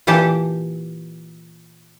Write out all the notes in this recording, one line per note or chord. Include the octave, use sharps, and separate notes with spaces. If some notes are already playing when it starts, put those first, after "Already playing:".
A#2 E3 G4 A4 A5